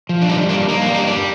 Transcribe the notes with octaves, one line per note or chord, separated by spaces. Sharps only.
F3
D4
G3 D#4
A#3 D4
A#3 D#4
D4
G3
D#4
G3 D4